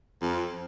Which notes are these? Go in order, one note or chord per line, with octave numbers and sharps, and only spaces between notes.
F2